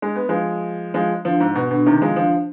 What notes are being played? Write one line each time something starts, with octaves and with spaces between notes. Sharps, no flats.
G#3
B3
F3 G#3
F3 G#3
D3 F3
G#2
B2
B2 D3
C3 D#3
F3 G#3
D3 F3